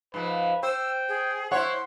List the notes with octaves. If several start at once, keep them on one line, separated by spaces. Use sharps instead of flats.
G#2 F3 B4
C5 G5 E6
G#4
E4 C5 C#5 F#5 C6